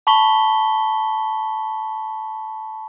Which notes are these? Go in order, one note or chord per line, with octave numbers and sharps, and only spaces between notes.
A5 B5 C#6 B6 G7